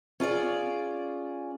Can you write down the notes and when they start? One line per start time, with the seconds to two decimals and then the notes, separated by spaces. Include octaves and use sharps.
0.20 C#4 F4 G#4 D5